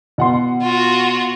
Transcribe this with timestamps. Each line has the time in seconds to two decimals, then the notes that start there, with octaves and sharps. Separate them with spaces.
0.18 B2 F#5 C6
0.62 F4 F#4